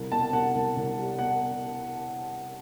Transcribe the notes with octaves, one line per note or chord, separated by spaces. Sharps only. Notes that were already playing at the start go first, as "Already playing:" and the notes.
Already playing: C2
B2 A5
C2 F#5
C2
C2
G3
B2 F#5